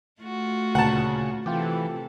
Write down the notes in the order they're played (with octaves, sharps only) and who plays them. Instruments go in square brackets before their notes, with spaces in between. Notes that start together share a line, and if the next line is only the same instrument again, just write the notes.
[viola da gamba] A3 F4 F#4
[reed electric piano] D2 A#2 [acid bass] C#3 [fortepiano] F#5 A5
[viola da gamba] C3 A4 [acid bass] E3 [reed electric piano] F4 G5 D6